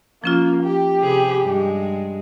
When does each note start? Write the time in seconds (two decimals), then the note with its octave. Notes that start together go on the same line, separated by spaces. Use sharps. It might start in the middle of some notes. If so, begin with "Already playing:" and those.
0.24 F3 A#3 C#4 F4
0.63 G4
0.99 C3 G#4 B4
1.42 G2 G#3